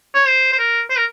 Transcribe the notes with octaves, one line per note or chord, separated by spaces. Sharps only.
C#5
C5
C5
A#4
C5
A#4